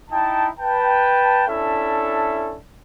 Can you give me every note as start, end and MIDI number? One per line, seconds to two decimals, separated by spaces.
0.11 0.47 63
0.11 0.47 64
0.11 0.47 79
0.11 0.47 81
0.59 1.44 71
0.59 1.44 79
0.59 1.44 81
1.48 2.57 61
1.48 2.57 62
1.48 2.57 64
1.48 2.57 69
1.48 2.57 76
1.48 2.57 81